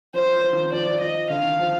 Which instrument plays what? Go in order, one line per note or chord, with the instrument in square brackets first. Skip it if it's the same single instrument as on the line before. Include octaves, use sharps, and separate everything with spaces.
[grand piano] F3 [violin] C5
[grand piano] F3
[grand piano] F3 [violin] C5
[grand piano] D#3
[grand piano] F3 [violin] D5
[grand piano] F3
[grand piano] F3 [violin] D#5
[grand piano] D3 [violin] F5
[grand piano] D#3
F3